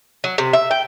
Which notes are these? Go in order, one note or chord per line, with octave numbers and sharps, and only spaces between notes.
F#3
C3
E5
G5